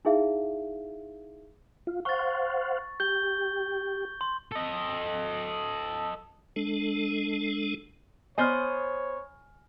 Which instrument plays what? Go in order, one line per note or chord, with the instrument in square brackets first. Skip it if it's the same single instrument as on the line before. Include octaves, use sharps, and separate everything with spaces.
[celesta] D#4 E4 G#4 E5 F5
[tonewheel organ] F4
[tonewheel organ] C5 F5 F#5 [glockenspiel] C#6 A6
[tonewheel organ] G4 [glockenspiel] G6 G7
[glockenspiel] C6
[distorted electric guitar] A4 D#5
[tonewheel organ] G#3 D4 A4
[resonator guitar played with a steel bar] B3 C5 D#5 [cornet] C#5 [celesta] G#5 F6